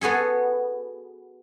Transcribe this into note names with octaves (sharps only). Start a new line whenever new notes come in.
B3 F#4 G#4 A4